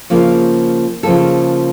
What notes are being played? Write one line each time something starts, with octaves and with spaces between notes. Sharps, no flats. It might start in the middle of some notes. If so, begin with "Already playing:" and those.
C#3 F3 A#3
C#3 F3 A#3 A4